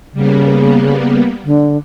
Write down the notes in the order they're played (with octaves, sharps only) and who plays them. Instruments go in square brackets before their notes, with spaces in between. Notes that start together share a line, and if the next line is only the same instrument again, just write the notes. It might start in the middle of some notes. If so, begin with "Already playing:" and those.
[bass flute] C#3 [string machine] G3 A#3 B3
[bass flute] D3